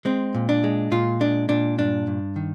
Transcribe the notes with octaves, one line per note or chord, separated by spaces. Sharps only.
G#3 C4
A#2
D4
G#3
A#2 F4
G#3 D4
A#2 D4
G2 D4
G2
D#3